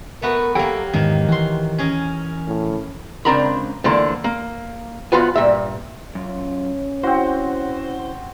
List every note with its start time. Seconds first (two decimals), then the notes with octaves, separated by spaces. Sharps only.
0.22 A3 B3 F#4 A#4
0.55 F#3 A#3 G4 A4 G5
0.94 E2 G#2 D#3 A#3
1.28 E3 F#4 C6
1.79 C#4 G#4 A#4
2.47 A2
3.25 C#2 C4 D4 A#4 A#5 B5
3.84 D3 E3 F3 A3 A#3
4.24 A#3
5.12 E2 F3 F4 F#4 B4 G#5
5.35 G2 A#2 E5
6.15 F#2 C#4 F4
7.03 C4 E4 F#4 C5 F#5